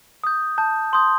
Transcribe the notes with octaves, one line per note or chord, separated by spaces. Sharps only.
D#6 G6
A5 G6
C6 D#6 G6